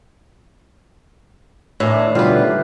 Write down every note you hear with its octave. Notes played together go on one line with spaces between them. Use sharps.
A2 D#3 E3 D4 E4
B2 D3 G3 F4 B4